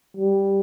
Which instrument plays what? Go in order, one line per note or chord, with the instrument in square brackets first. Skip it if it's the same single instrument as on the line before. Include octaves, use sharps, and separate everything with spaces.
[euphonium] G3